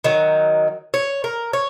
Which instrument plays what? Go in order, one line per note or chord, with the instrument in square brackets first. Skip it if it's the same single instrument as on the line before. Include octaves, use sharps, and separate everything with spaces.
[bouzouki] D#3 F#3
C#5
A#4
C#5